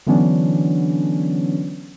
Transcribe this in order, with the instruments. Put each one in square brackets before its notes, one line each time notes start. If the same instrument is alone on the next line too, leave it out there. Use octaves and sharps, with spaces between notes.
[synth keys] D3 E3 F#3 B3 C#4 D4